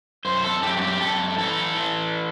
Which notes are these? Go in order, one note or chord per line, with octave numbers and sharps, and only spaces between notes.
F#2 C5
A4
F#2 G4
F#4
G4
F#2 A4
E3 A4
E3